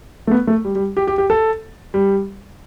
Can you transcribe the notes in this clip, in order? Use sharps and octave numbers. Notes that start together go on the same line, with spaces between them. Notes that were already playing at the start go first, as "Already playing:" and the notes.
A3
B3
A3
G3
G3
G4
G4
G4
A4
G3